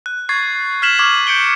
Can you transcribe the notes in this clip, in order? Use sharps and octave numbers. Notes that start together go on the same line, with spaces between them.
F#6
C#6 G#6 A6 C7
F6 G#6 B6 E7 F#7
C#6 D6 F6 G#6 F#7
G6 C#7 D7 G7